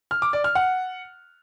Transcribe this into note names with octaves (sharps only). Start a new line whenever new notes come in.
F6
D6
D5
F6
F#5